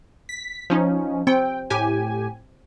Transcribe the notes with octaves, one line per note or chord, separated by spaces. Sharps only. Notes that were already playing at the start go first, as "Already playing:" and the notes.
B6
F3 C#4 D#4
C4 G5
A2 G4 G#5